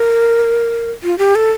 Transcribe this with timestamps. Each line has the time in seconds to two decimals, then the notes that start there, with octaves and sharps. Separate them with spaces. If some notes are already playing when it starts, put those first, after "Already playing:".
Already playing: A#4
1.03 F4
1.18 G4
1.35 A4